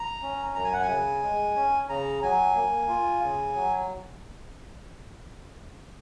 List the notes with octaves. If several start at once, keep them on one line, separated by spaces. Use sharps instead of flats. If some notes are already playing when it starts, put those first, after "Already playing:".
Already playing: A#5
C#4
F#2 A#5
G#5
F#5
G#5
C#3
G#3
C#4
C#3 A#5
F#3 G#5
A#3
F4
C#3
F#3